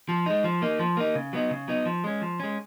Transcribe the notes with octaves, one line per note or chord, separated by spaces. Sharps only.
F3
G#3 D#4
F3
A#3 D#4
F3
A#3 D#4
C#3
F#3 B3 D#4
C#3
F#3 B3 D#4
F3
G#3 C#4
F3
G#3 C#4